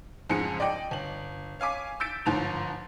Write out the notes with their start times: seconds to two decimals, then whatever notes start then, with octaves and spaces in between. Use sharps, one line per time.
0.30 F2 G#2 C#3 G#3 G#4 C#7
0.60 D5 D#5 G5
0.91 G1 F#7
1.60 C#5 F5 G#5 D6 B6
2.00 E6 G6 A6 B6 D7
2.26 G1 G#2 F3 A6 F7